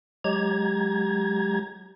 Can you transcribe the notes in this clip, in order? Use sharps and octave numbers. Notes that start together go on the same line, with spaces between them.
F#3 G#3 G4 A#5 G#6